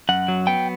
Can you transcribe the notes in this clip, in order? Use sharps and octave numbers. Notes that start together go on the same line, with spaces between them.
F#2 F#5
F#3
B3 G5